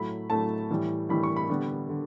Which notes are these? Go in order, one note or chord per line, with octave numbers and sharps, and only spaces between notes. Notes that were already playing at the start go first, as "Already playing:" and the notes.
Already playing: A2 F#3 A3 B5
A2 F#3 A3 A5
A2 E3 G3
A2 E3 G3 B5
C#6
B5
D3 G3 B3
D3